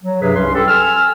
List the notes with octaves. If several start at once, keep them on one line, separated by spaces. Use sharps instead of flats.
F#3
G2 C3 F#3 G#4 B4
C2 C#4 B4 C6
G4 A4
G#5 E6 F6